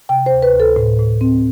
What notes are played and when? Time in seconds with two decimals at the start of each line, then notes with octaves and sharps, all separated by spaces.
0.09 C3 G5
0.26 D2 C5
0.42 B4
0.55 D2
0.60 A4
0.76 A2
0.99 A2
1.21 C4